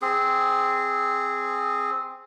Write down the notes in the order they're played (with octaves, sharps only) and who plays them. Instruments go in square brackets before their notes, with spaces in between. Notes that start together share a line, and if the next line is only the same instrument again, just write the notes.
[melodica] C4 G#4